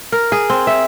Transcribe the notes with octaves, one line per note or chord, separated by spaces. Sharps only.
A#4
G#4
C4
E5